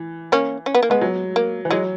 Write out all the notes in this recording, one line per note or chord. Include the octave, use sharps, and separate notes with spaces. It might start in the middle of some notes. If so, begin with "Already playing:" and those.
Already playing: E3
A#3 C#4
C#4
B3
A#3
G#3 B3
F#3
A#3
E3
F#3 G#3